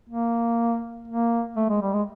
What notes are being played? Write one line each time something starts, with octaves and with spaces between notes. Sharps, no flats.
A#3
A#3
A3
G#3
G3
G#3